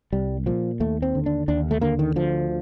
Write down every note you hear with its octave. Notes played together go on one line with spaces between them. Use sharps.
C2 G3
A#2 F3
D#2 A3
C4
D3
D4
D#2 D4
A3
D3 A#3
D#3
D2 F3